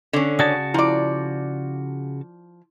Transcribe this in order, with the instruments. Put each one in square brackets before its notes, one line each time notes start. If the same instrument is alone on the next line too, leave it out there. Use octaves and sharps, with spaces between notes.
[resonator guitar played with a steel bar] D3 C#4
[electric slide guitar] C#3 F#4 A5 [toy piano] D5 D#6
[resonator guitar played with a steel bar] F3 D5 [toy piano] E4